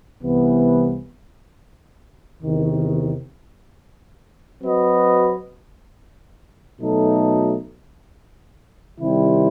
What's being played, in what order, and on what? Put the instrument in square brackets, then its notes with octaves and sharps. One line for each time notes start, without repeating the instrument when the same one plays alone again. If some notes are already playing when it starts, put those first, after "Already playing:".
[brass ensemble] C2 C3 E3 B3
E2 C3 D#3
F#3 C4 F#4 B4 D#5
B2 F#3 A3 D#4 A4
C3 D#3 G3 C4 E4